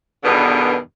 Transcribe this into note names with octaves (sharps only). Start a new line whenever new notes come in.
E2 G2 B2 D3 D#3